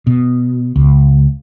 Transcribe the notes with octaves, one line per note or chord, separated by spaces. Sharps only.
B2
C#2